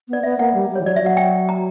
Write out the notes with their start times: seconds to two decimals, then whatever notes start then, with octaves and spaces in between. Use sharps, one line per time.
0.08 B3 D5
0.23 B3 E5
0.39 A#3 F#5
0.54 G3
0.70 G3
0.76 C#5
0.81 E3
0.85 F#3 D5
0.96 E5
1.01 F#3 F#5
1.17 G5
1.49 A#5